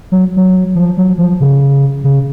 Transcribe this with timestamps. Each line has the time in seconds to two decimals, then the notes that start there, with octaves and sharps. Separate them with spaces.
0.12 F#3
0.37 F#3
0.75 F3
0.97 F#3
1.18 F3
1.40 C#3
2.04 C#3